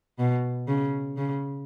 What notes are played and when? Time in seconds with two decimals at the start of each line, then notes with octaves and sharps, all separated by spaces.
0.19 B2
0.68 C#3
1.17 C#3